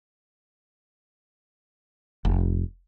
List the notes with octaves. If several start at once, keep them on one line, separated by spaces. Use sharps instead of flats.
F1